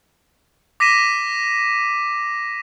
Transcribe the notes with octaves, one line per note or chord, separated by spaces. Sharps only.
D6 A#6 B6 D#7 E7